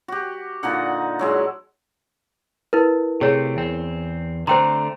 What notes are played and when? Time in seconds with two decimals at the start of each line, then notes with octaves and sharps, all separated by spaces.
0.08 F#4 G4
0.63 A#2 D3 D#4 F#5
1.19 F#3 G#3 E4
2.73 E4 A#4 B4
3.21 C3 A3 C4 G#4 C#5
3.56 E2 C4
4.47 D3 A3 C4 C5 G5 A#5 C6